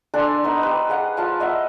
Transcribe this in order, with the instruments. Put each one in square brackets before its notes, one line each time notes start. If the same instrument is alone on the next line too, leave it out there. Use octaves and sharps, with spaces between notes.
[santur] D4 A4 G#5 C6
B3 D#4 B4 D#5
G4 B4 C5
G#4 F5 F#5
F3 F5 A5
D#5 E5 F#5